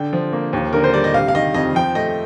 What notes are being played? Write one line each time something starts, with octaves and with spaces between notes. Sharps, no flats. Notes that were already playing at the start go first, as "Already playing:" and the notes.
Already playing: D3 G5
F3
A#3
D#2
D3 A#4
C5
G3 D5
D#5
C3 F5
F5
D#3 D#5
F2 D#5
F3 G5
A3 D#5